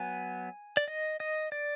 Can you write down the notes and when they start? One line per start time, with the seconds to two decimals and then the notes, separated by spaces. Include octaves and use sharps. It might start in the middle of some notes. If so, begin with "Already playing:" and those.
Already playing: F#3 B3 G#5
0.77 D5
0.88 D#5
1.20 D#5
1.52 D5